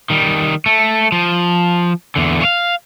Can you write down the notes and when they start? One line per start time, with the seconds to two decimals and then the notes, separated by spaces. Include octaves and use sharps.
0.10 D#3 G3
0.66 A3
1.12 F3
2.16 E2 D3
2.42 C#5 F5